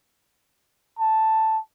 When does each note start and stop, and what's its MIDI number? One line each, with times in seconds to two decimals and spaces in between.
0.99 1.59 81